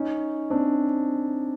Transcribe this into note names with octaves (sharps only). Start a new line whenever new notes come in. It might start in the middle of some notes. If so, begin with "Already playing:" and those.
Already playing: C#4 D#4
C4 D4